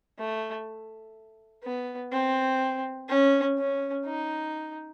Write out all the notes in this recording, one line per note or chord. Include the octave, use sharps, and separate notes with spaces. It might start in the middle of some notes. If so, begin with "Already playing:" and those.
A3
B3
C4
C#4
C#4
D#4